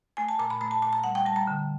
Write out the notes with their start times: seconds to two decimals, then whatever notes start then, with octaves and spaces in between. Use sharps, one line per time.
0.17 A3 G#5
0.29 A5
0.39 A#2 A#5
0.50 B5
0.61 A3 A#5
0.71 A5
0.82 A#2 A5
0.93 A#5
1.04 G3 F#5
1.15 G5
1.26 G3 A5
1.36 A#5
1.47 D3